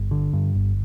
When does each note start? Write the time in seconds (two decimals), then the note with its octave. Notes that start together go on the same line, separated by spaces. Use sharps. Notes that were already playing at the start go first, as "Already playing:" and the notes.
Already playing: G1
0.11 D3
0.33 G2
0.55 G1